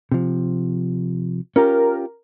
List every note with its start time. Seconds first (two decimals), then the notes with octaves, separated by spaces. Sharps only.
0.12 C3 F3
1.56 C#4 F4 G4 A#4